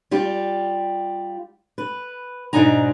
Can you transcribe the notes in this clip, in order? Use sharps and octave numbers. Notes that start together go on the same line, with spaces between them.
G3 F4 G4
B4
G#2 B2 D4 D#4 G#5 A#5